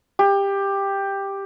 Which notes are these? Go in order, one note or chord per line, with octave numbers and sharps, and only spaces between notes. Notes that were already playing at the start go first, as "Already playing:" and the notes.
G4